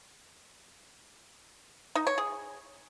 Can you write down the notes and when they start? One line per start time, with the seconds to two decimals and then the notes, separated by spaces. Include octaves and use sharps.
1.95 D#4
2.07 C#5
2.18 G#4